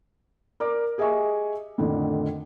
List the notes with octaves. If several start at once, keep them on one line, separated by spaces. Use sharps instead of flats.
A#4 D5 D6
G4 G#4 D#5 E5 G#5 C#6
F2 A2 D3 D#3